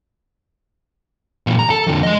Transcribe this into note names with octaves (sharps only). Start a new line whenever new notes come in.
A#2 E3
A#5
A4
F2 D3
G#3 D#5